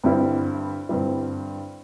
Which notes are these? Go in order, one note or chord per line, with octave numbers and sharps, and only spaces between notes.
G2 D3 G3 C4 E4
G2 D3 G3 C4 E4